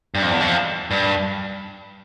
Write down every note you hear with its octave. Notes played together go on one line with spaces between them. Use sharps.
G2
F2
E2
F2
G2